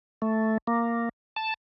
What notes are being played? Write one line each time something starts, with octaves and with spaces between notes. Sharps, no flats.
A3
A#3
A5